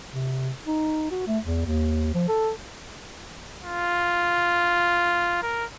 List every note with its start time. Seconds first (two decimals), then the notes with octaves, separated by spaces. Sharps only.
0.13 C3
0.66 D#4
1.11 F#4
1.27 A3
1.45 E2
1.66 D#2
2.14 F3
2.28 A4
3.63 F4
5.42 A#4